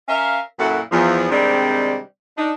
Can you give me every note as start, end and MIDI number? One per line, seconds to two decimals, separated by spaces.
0.08 0.39 61
0.08 0.39 70
0.08 0.39 76
0.08 0.39 77
0.59 0.80 42
0.59 0.80 46
0.59 0.80 64
0.59 0.80 66
0.59 0.80 69
0.59 0.80 78
0.92 1.31 40
0.92 1.31 53
1.31 1.98 48
1.31 1.98 51
1.31 1.98 55
1.31 1.98 56
1.31 1.98 60
1.31 1.98 62
2.37 2.52 62
2.37 2.52 63